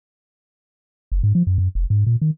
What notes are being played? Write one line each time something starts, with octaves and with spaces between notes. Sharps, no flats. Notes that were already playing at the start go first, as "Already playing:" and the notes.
F#1
G#2
F3
F#2
F#2
F1
G#2
A#2
D#3